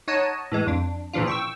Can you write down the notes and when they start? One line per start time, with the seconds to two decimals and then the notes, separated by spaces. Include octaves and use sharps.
0.08 D#4 C#5 D#5 F#5 A5 D#7
0.52 A2 E3 G#3
0.67 F2 D4
1.13 A#2 C#3 E3 F3 D4 F4
1.27 G5 C#6 E6